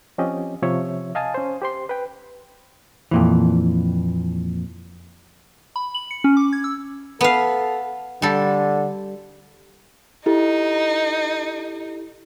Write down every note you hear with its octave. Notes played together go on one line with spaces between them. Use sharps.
F3 C4 C#4 F4 G4 D#5
C3 F3 C#5 E5
D#5 F5 G#5 A5 D#6
C#4 C5
G4 C5 C6
B4 G5
F2 A#2 E3
B5
F#7
C#7
C#4
D6
G#6
E6
B3 A4 F5
D3 G3 A4
D#4 E4 G4 A4